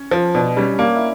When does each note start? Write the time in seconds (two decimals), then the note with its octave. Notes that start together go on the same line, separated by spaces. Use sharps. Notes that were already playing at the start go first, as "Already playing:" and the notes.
Already playing: C#4
0.11 F3
0.34 B2 D4
0.57 G3 C#4
0.74 C#4
0.79 A#3 D4
0.96 E4